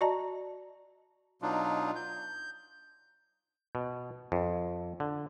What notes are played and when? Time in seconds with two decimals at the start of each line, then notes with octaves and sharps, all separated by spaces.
0.01 F#4 D5 D#5 A5 A#5
1.42 B2 F#3 D4 D#4 F4
1.96 G6
3.75 B2
4.32 F2
5.00 D3